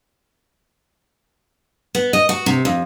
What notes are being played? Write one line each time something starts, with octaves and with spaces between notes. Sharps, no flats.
B3
D#5
F#4
C3
F2